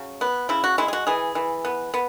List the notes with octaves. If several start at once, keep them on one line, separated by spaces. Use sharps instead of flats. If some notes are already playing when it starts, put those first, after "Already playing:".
Already playing: C#3 F#3
B3
C#3 E4
F#4
G#3 E4
G#4
F#4
E3 G#4
E3
B3
B3